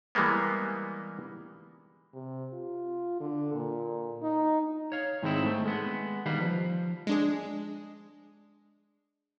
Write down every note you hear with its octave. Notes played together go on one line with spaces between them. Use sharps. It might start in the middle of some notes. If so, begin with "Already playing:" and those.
E3 G3 G#3 A#3 B3
C3
F4
D3
A#2
D#4
C#5 F5
G#2 D#3 G#3 C4 E4
A3
G#3 B3
D#3 G3 B4 F5
F3
G#3 D4 G#4